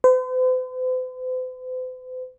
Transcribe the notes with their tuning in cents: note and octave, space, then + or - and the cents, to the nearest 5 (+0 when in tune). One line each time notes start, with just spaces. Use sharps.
C5 -45